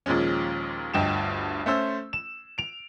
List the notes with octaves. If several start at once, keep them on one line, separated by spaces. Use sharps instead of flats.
D#2 A#2 F3 G#3 C#4
G1 D2 G2 D#5 G5 E7
A3 C#4 C5 E6
E7
D7 F7